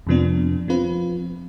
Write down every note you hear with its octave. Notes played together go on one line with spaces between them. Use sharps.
F2 C3 F3 B3 D4
F3 C4 F4 B4